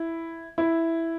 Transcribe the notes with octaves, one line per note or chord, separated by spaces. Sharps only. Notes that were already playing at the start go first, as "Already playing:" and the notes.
Already playing: E4
E4